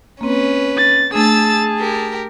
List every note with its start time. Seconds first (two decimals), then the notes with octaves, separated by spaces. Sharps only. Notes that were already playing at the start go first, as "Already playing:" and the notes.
0.21 A#3 C4 C#4 B4
0.78 A6
1.14 A3 D4 G#4 A5 E6 A6
1.79 G4 A#4